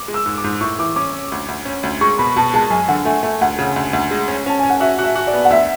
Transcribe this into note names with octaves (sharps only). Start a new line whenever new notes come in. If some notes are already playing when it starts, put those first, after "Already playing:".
Already playing: D6
G#3
E6
G#2
D6
G#2
A2 C#6
E3 D6
C#4 D6
C#4
D2
D2
C#4
D2
G#3 C#6
B2 B5
B2 A5
G#3 A5
F#2 G#5
D3 F#5
A3 G#5
A3 G#5
D2 F#5
C#3
D2
D2
G#3
C#4
C#4 A5
C#4 G#5
F#5
F#4 E5
F#4 E5
F#4
D5
B3
F#5
D2 E5